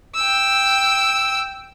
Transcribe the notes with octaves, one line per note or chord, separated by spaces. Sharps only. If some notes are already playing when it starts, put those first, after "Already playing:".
G5 E6